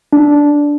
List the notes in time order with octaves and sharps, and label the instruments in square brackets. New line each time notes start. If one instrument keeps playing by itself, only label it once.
[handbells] D4